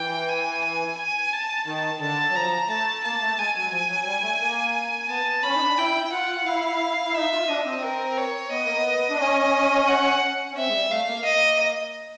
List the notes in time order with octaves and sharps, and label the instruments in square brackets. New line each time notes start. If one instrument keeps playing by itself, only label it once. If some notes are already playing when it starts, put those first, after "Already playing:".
Already playing: [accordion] E3 [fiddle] G5
[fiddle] G#5
G#5
G#5
A5
[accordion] D#3 [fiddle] A5
[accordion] D3 [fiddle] A5
[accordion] F#3
[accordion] F3 [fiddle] A#5
[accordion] A3 [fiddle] A5
[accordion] A#3 [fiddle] A5
[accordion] A3
[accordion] G#3 [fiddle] G#5
[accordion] F#3
F3
F#3
G3
A3
A#3
[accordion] B3 [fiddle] A5
[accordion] B3
[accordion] C#4 [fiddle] B5
[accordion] D#4
D4
[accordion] E4 [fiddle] G5
[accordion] F4 [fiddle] F#5
[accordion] E4 [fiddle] F5
[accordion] E4
[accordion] D#4 [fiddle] E5
[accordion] F4
[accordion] D4 [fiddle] D#5
[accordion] C4
[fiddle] A#4
C#5
[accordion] B3 [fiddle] D#5
[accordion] A#3
B3
D4
[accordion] C#4 [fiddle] D#5
[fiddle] F#5
[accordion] C#4
[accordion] C4 [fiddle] E5
[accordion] G#3
G3
[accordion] A3 [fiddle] F5
[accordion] A#3
[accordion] A#3 [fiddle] D#5